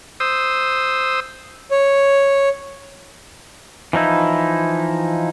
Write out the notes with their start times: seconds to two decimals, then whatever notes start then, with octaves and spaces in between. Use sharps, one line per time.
0.20 C5 D#6 E6
1.71 C#5
3.93 E3 F3 D#4 E4